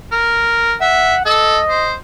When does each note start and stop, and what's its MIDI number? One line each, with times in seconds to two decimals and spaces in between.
0.12 0.74 70
0.81 1.15 76
0.81 1.22 78
1.26 1.59 69
1.26 1.96 75
1.69 1.93 72